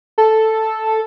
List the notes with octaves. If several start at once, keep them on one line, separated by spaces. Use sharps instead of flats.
A4